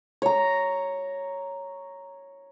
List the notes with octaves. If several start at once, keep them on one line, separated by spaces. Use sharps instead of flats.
C#5 A#5